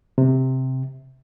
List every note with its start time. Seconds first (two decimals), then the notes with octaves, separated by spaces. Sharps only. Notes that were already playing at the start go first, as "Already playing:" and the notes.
0.18 C3